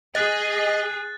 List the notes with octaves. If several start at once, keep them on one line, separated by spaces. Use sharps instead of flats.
G#4 D#5 F#6 A6